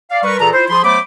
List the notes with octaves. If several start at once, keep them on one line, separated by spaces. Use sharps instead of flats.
D5 F5
G3 A#4 B4 C#6
A#2 E3 G#4 A4 A5 A#5
E4 F4 C5
F3 G#4 B5 C6
F#3 A3 B3 C5 B5 D6